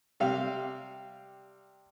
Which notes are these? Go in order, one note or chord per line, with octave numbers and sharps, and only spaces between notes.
C3 G3 F5